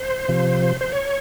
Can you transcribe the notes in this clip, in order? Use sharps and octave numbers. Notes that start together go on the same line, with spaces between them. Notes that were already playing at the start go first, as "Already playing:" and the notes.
Already playing: C5
C3 F3
C5
C#5